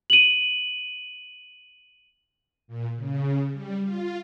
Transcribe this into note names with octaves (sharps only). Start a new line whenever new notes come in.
D#7 F#7
A#2
C#3
G3
F4